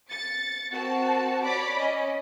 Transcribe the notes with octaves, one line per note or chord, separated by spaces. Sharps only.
A6 C#7
C4 F#4 A#4 A5
C#5 D5 B5 D6
C#4 D#5